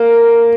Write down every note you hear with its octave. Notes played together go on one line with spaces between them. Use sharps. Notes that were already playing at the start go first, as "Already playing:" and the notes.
Already playing: A#3